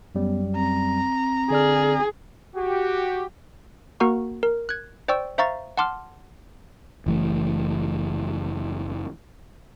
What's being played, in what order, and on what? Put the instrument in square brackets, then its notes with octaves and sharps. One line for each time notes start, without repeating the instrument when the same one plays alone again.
[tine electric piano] F#2 F#3 G3 [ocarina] B3
[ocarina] C4 [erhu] A#5
[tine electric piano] D3 D5 F6 [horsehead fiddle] G#4
[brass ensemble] F#4 G4
[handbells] A#3 F#4 A#4 F#5 A#5 C#6
A#4
F#6 G#6
C5 D5 G5 C#6 E6
C5 E5 F5 A#5 C#6 A6
F#5 A5 C6 D6 F6
[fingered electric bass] F#1 E3 A3